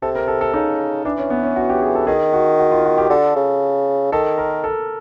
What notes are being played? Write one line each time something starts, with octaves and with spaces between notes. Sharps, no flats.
C3 A4
A#4
A4
A4
C#3 D#4
E3 D4
C#4
B3
C#4
F#4
G4
G#4
A4
D#3 G#4
F#4
F#4
F4
F#4
G4
D3 A4
C#3
D#3 A4
A#4
A4